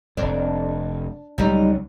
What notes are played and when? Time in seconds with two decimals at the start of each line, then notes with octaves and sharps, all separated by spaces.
0.17 F1 F2 D4
1.38 C#2 F#3 G3 D#4